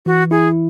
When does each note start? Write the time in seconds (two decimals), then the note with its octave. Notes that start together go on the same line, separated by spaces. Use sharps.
0.06 E3 F#4
0.31 E4 G#4